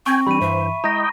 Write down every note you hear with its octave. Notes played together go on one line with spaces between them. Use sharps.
C4 G5 G#5 C#6
E3 G3 D4 G4 B5 D#7
G2 E3 C5 E5
G#3 E4 D#5 G5 A#5 A#6